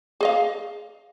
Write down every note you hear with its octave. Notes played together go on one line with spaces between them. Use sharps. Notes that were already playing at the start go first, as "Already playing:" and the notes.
G#4 D#5 F5